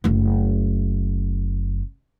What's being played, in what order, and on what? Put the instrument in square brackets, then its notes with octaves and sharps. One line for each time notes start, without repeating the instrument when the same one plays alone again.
[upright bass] F#1 A3